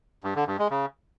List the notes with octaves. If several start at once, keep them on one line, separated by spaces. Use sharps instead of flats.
G2
D3
G2
G#3
C#3